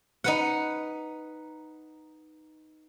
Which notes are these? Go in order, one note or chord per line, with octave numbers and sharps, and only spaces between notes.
D#4 B4 F#5